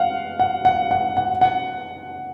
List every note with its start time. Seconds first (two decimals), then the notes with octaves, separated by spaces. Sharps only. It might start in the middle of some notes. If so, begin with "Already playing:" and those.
Already playing: F5 F#5
0.40 F#5
0.65 F#5
0.91 F#5
1.17 F#5
1.41 F#5